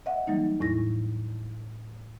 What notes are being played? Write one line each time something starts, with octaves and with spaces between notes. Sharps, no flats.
D#5 E5 F#5
E3 F#3 G3 A#3 D#4
E2 A2 E4 A#6